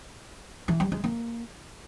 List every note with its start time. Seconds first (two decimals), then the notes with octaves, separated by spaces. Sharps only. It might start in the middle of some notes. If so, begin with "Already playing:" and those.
0.68 E3
0.80 G3
0.92 G#3
1.04 A#3